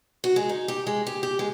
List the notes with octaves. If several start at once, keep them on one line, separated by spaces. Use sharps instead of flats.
F#4
G#3
D#4
G4
G#3
G4
G4
G#3